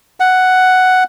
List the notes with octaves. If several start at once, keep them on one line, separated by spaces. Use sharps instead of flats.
F#5